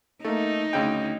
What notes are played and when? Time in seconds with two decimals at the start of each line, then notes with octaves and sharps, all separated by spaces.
0.24 A3 A#3 D#4
0.73 D2 C#3 G5